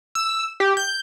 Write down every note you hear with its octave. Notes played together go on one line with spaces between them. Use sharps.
E6
G4
G6